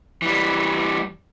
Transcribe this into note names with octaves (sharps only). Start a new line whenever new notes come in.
E3 G3